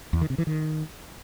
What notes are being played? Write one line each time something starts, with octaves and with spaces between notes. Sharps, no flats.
E2
D#3
C3
E3
D#3